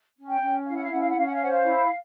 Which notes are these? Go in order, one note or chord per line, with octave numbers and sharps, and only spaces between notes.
C#4
G5
C#4
E4 F5
F#5
F5
C#4 F#5
F5
F#5
C#4 F5
F#5
F5
C5 F#5
F5
E4